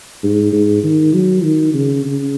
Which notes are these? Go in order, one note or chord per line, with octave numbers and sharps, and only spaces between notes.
G#2
G#2
D#3
F#3
D#3
C#3
C#3